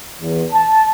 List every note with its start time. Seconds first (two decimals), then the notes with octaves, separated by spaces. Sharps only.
0.21 E2
0.52 A5